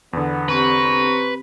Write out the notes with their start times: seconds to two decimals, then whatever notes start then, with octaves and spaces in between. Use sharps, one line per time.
0.13 E2 D3 B3
0.49 C4 G4 B4 C5 A#5 C#6